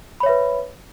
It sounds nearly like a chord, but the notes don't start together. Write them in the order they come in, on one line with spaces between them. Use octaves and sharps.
B5 C#5 E5 B4